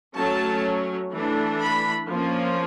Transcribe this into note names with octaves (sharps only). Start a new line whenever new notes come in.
F#3 A3 C#4 A5
E3 A3 D4
B5
F3 A#3 C#4